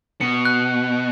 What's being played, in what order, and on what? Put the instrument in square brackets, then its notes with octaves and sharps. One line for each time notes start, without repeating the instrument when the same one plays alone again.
[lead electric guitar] B2 [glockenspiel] C#7
[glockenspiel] F#6